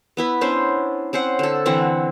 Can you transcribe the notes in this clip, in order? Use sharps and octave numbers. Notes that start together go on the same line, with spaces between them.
B3 E4 B4
B3 C#4 D4 C5
C4 C#4 C5 F#5
D3 A4
D3 E3 C4 F#5